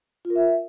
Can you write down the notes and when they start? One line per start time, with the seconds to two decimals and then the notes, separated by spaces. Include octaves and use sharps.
0.25 F4
0.30 A#4
0.36 E5